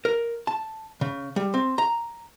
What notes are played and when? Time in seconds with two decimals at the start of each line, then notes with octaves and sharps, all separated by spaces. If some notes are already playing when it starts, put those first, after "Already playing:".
0.05 A#4
0.47 A5
1.01 C#3
1.36 G3
1.54 C4
1.78 A#5